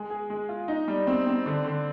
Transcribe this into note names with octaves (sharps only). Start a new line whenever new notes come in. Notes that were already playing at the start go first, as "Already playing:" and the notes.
Already playing: G#3
G#4
G#3
F4
D#4
G3
C4
C4
D3
D3